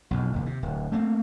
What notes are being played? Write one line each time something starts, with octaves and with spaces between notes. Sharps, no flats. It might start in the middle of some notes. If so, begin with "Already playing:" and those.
B1 F2
F1 D#2
C3
D1
A3 A#3 C4